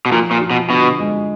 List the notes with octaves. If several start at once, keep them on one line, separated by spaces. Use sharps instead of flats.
B2
A#2 F3
A#2
F3
B2
B2 D3
G#3